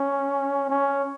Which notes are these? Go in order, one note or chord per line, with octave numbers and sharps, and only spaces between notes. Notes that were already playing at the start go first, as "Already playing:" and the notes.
Already playing: C#4
C#4